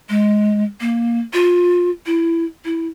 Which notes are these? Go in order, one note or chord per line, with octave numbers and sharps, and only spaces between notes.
G#3
A#3
F4
E4
E4